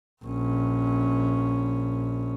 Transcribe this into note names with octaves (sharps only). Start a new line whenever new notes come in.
A#1 C#4